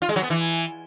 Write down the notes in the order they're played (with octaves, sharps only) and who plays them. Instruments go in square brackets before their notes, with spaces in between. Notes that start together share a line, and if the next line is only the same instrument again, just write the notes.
[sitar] F4
G#3
F#3
B3
E3